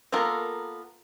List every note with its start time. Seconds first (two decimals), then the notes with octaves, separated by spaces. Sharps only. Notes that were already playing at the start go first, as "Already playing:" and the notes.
0.12 A#3 B3 F4 A4 A#4